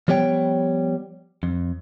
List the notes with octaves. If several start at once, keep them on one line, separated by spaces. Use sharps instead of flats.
F3 G3 B3 C#5 G5
F2